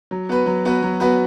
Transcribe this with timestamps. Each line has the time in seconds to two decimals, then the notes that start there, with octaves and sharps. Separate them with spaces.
0.11 F#3
0.29 B3 F#4 B4
0.46 F#3
0.65 B3 F#4 B4
0.83 F#3
1.00 B3 F#4 B4